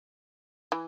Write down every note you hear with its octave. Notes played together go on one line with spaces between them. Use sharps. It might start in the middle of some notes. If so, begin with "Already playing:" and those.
E3